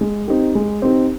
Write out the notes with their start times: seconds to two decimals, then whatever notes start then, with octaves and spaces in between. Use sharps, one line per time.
0.01 G#3
0.28 C4 D#4 G4
0.55 G#3
0.82 C4 D#4 G4